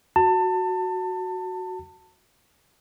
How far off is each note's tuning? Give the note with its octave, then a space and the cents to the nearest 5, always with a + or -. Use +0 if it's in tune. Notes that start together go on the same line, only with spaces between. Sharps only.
F#4 +0 A5 +25